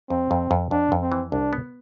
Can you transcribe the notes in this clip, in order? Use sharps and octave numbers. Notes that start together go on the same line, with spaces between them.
F2 C4
F2
F2
F2 D4
F2
C4
E3
C2 D4
B3